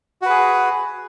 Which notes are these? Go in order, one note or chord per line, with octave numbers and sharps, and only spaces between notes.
F#4 G#4 B4